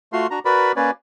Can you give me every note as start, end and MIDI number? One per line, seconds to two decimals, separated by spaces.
0.13 0.27 57
0.13 0.27 65
0.13 0.27 66
0.13 0.27 84
0.31 0.39 62
0.31 0.39 66
0.31 0.39 82
0.45 0.72 66
0.45 0.72 70
0.45 0.72 71
0.45 0.72 74
0.45 0.72 83
0.76 0.91 58
0.76 0.91 61
0.76 0.91 71
0.76 0.91 73
0.76 0.91 74